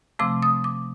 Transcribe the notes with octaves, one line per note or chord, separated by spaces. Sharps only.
C3 F3 A3 C4 D6
D#6
D6